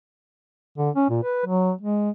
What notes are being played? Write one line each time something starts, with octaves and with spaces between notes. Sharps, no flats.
D3
C#4
A#2
B4
F#3
G#3